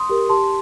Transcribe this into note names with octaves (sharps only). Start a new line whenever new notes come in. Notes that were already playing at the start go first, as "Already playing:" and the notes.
Already playing: C6 D#6
G4 A#4
G4 A5 C6